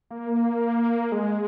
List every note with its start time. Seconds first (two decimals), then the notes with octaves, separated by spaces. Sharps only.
0.11 A#3
1.12 G#3